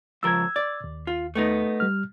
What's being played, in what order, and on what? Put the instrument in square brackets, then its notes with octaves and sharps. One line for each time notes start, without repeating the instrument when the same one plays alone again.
[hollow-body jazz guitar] C#2 F3 A#4 [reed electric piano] E6 G#6
[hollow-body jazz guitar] D5
[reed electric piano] D#2
[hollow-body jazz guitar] F4
A3 B3 D#4
[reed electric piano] G3 F6